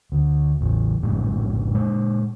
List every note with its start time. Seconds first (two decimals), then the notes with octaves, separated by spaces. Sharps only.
0.12 D2
0.60 A1 E2
1.02 A#1 F#2 A2 G#3
1.74 A#2 G#3